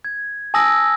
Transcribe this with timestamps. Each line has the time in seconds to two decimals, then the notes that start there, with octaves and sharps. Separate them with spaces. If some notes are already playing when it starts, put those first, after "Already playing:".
0.05 G#6
0.54 G#5 A5 D#6 E6 A#6